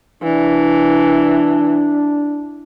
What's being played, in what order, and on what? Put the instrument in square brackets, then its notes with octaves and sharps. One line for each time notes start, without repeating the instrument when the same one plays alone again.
[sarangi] E3 [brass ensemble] D4